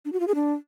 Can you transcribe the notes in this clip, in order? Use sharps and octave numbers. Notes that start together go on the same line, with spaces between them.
D4
F#4
F4
G#4
D4